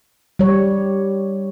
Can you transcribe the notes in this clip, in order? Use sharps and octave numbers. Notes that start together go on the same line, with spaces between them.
G3 C#5